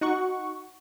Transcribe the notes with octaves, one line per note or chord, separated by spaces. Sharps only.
D#4 F#4 F#5 C#6